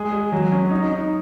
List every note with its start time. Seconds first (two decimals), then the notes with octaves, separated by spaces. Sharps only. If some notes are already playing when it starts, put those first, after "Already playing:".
Already playing: G#3 G#4
0.12 G#4
0.32 F#3
0.52 C#4
0.71 D#4
0.91 D#4